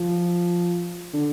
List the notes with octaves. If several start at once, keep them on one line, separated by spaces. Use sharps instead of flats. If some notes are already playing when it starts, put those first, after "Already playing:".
Already playing: F3
D3